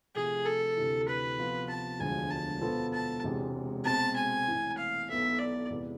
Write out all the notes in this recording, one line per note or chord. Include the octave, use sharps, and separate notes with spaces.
C3 F3 A3 G#4
A4
D2 C3 E3
B4
C3 F3 B3 F4
A5
E1 D2 D3 F3 G#3 G#5
A5
B2 B3 F4 A4 C5
A5
E1 E2 C3 G#3
B2 G#3 C4 G#4 A5
G#5
A1 A2 E3
F5
B1 B2 B3 E4 A4 E5
D5
E2 C3 G#3 B3